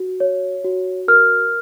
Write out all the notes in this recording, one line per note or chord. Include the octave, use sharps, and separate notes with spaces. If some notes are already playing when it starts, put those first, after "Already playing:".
Already playing: F#4
C#5
F#4
A#4 F6